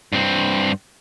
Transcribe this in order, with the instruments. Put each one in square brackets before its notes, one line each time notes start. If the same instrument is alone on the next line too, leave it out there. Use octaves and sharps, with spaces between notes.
[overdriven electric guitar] G2 C4